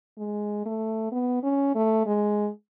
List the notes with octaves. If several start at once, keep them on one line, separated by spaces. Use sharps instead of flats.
G#3
A3
B3
C#4
A3
G#3